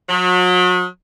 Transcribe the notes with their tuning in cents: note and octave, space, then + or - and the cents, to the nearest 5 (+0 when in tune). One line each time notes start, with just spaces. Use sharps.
F#3 -35